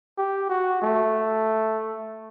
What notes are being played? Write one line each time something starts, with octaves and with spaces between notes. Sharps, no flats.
G4
F#4
A3